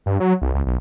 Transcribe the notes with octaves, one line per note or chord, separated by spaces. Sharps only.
G2
F#3
C2
C#2
B1